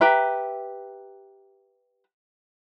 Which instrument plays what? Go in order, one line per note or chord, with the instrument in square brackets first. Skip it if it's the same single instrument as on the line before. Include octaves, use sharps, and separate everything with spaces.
[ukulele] G4 B4 E5 A#5